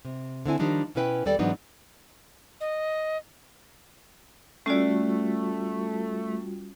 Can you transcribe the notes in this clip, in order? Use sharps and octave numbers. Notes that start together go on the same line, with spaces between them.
C3
D3 C4 E4 G#5
D#3 F3 G3 D4 D#4
B2 C#4 E4 B4 F5 G5
D#2 G3 A4 D5 G5
G#2 E3 F#3 B3 D4 D#4
D#5
G3 A3 C#4 F4 F#4 D5